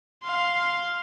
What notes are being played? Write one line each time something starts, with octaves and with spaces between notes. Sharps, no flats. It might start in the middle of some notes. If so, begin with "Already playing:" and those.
F5 C6